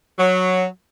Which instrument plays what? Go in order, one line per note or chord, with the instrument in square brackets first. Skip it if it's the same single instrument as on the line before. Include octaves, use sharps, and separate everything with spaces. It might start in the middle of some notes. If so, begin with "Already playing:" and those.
[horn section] F#3